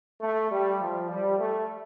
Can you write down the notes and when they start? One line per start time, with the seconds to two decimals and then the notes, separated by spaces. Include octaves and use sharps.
0.21 A3
0.50 G3
0.80 F3
1.09 G3
1.38 A3